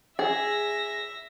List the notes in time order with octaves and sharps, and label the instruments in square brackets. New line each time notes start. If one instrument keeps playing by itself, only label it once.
[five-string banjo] G#4 [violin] E5 A#6